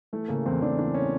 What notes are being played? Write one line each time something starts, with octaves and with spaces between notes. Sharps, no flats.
E3 A3
C#3 A#3
E2 C4
E2 D4
E3 D4
C#4